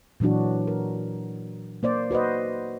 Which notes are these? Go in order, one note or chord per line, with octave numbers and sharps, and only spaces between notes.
A#2 E3 F#3 D4 F#4
A#4
A#3 C5 D5
F#4 B4 C5 D#5